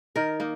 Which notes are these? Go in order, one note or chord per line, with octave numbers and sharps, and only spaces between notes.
D#3 A#4
A#3 D#4